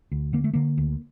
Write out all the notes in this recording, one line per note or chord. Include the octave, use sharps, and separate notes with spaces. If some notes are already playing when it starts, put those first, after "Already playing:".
D2
D3 A#3
A3
D3 A#3
D2